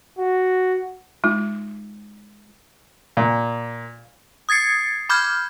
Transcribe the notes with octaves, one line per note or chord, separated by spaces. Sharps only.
F#4
G#3 D#4 F4
A#2
D#6 G#6 A6 C7 C#7
B5 D6 F6 G6 G#6